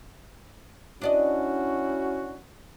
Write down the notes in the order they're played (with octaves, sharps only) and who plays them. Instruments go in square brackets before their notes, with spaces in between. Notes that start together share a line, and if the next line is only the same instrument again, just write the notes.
[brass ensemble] C#4 E4 F#4 [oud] D4 D5 D#5